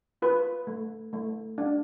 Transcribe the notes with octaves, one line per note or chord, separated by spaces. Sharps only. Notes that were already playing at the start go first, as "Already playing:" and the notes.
F4 B4
A3
A3
D4